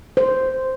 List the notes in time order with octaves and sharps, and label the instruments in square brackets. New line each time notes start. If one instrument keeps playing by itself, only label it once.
[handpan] C5